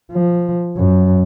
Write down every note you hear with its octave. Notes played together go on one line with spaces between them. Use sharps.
F3
F#2